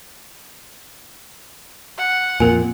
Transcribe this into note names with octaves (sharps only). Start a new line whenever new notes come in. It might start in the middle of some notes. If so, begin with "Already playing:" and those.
F#5
F2 A#2 A#4 G#5